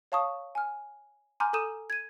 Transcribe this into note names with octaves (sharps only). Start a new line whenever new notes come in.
C#5 F5 A5 C#6 D#6
G#5 F6
G#5 A#5 C6 D6 F6 G6
A4 A#5 D#6 G6 D#7 E7
G#6 D#7